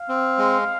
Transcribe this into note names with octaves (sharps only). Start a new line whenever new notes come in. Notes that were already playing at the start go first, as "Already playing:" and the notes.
Already playing: F5
C4
G#3